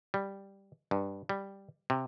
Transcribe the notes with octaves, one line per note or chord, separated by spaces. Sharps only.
G3
G2
G3
C3